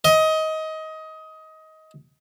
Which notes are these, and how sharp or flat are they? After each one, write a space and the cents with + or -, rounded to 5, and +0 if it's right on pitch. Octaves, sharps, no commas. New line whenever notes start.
D#5 +20